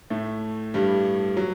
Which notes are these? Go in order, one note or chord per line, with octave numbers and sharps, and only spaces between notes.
A2 A3
G2 G3
F#3